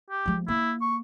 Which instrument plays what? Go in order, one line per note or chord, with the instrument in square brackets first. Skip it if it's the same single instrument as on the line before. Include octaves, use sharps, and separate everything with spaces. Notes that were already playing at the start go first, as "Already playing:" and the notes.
[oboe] G4
[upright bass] F3 G#3
[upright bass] A#3 [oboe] E4
[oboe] C#6